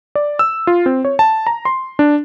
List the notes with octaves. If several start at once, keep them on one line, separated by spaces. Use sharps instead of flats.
D5
E6
F4
C4
C#5
A5
A#5
C6
D4